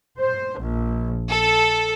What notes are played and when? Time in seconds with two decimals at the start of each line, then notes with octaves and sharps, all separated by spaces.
0.20 C5
0.59 A#1
1.28 A4